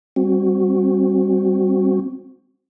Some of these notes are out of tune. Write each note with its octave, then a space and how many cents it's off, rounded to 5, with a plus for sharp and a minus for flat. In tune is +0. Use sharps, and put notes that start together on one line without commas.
G3 +0 C4 +10 F#4 +0